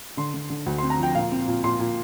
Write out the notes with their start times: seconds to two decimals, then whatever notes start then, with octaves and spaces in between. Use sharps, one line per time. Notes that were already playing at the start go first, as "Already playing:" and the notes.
0.17 D3 C6
0.34 D3
0.50 D3
0.66 D2
0.78 C4 C6
0.90 A#5
0.99 F3 G5
1.15 A#2 F5
1.32 C4
1.48 A#2
1.63 A#2 C6
1.79 A#2